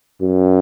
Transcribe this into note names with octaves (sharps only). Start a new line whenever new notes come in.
F#2